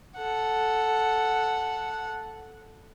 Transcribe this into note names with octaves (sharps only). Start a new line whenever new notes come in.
A4 F#5